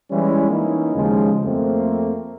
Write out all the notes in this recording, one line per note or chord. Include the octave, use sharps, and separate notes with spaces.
E3 G3 G#3 C#4 E4
E3 A#3 C#4 D#4 E4
D#2 C#3 F3 G#3
F2 A3 A#3 C4